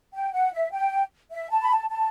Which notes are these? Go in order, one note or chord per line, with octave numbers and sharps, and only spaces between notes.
G5
F#5
E5
G5
E5
A5
B5
A5
A5